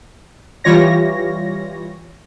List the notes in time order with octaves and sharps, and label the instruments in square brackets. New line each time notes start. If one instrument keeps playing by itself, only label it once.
[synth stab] E3 G3 F4 C#5 A#6